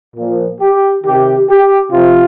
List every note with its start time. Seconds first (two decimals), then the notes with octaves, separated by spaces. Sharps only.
0.17 A#2 F3
0.61 G4
1.04 C3 D#3 G4
1.49 G4
1.92 C3 F3 F4